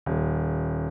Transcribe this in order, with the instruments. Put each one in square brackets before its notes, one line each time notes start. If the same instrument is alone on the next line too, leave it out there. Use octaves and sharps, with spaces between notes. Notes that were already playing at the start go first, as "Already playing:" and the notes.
[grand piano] D#1